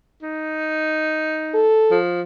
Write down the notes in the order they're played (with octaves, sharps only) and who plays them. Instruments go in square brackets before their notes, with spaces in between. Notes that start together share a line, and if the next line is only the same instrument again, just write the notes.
[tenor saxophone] D#4
[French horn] A4
[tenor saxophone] F3